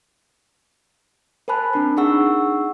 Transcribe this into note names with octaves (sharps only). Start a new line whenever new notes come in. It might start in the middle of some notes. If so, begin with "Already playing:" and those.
A#4 C5 G#5 A5 B5 F#6
C4 D4 A#4
D4 D#4 G#4 F#5 C#6 E6